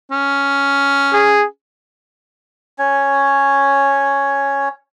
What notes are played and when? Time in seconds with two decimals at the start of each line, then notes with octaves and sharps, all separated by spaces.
0.11 C#4
1.14 G#4
2.79 C#4 C#5